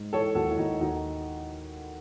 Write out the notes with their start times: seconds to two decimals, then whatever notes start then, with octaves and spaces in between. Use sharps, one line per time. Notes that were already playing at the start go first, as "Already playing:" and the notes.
Already playing: G#2
0.13 E3 A4 C#5
0.35 D#2 F#4 A4
0.51 E4
0.57 D#2 D#4 F#4
0.80 D#2 D#4 F#4